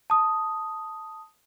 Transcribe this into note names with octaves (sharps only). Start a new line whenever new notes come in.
A5 D#6